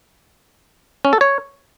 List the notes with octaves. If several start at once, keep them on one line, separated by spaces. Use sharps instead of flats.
C#4
A4
C#5